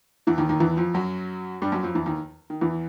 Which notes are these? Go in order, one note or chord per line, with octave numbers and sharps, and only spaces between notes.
E2 E3
D#2 D#3
D#2 D#3
E2 E3
F2 F3
F#2 F#3
G2 G3
F#2 F#3
F2 F3
E2 E3
D#2 D#3
D#3
E2 E3